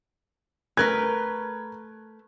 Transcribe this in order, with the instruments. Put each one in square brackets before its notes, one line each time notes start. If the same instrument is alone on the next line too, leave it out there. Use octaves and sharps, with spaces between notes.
[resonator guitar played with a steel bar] A3 A#4 B4 [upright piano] F#6 G#6